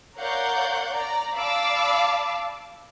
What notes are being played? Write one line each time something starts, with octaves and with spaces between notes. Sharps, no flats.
A#4 C#5 D5 F5 F#5 G6
D5 A#5
D5 F5 A5 B5 D6 E6